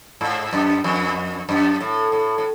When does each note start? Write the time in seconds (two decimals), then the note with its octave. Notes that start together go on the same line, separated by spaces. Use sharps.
0.21 G#2
0.53 F#2
0.84 F2
1.49 F#2
1.80 A2
2.12 A2
2.38 A2